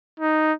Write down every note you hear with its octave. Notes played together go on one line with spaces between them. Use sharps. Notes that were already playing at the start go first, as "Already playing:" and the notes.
D#4